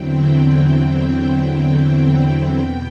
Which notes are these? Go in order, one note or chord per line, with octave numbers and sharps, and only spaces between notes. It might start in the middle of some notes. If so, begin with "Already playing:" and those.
Already playing: E2 D3 F#3 C4 E4 G5
G5
E2 B2 G5